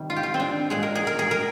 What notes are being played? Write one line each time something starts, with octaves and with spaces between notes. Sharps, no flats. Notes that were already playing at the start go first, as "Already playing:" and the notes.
Already playing: C3 D#3 G3
F4
G4
F4
C4
D4
A#2 G#3 G#4
A#4
G#4
A#4
G#4
A#4